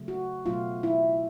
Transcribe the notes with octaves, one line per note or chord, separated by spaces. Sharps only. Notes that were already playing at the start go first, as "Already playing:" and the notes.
Already playing: C#3 F#3 A3
F#4
B2 F#3 A3 F4
E4